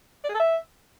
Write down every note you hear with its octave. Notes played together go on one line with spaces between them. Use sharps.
D5
G#4
A4
E5